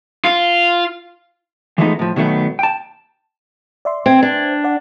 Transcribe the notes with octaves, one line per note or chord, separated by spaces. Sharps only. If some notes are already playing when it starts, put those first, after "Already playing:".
F4
E3 F3 G#3 A3 B3 D#4
A2 F3
B2 D#3 F#3 A3 B3
G5 A5
D5 E5 C6
C4 C5 E5 G#6
D4
D5 F#5